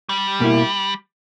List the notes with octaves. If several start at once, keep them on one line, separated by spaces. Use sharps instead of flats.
G3
B2 A#3 E4